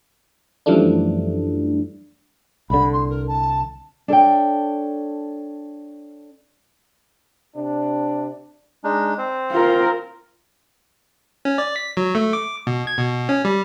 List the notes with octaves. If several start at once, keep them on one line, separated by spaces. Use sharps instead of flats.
F#2 E3 F3 G3 A3 D4
C2 D3 B5
C6
A#4
A5
D4 A4 C#5 G5
C3 D4
G#3 D4 D#4
C4 C5
F4 A#4
C#4
D5
B6
F#3
A3
D6
B2
G#6
B2
C#4
G3